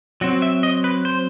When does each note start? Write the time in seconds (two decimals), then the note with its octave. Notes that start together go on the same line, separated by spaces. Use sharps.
0.21 F#3 C4 F#4
0.42 E5
0.63 D#5
0.84 B4
1.05 C5